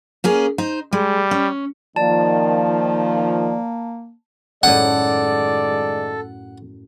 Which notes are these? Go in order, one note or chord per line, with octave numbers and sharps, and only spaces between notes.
A#3 C#4 G#4
D#4 C5
G3 G#3
C#4
D#3 F3 A#3 D5 A5
F#2 A2 D#3 G#3 A4 D5 F#5